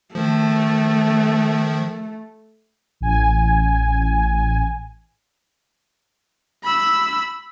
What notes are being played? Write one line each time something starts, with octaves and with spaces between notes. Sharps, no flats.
D#3 F3 A3
A1 G#5
B5 E6